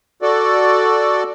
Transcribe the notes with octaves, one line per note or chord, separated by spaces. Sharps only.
F#4 A4 D5